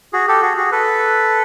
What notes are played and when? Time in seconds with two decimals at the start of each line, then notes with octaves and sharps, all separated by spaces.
0.13 F#4 G#4
0.28 G4 A4
0.42 F#4 G#4
0.57 F#4 G#4
0.72 A4 B4